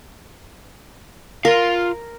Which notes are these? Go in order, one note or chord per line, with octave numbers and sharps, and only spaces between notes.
F4 A#4 F5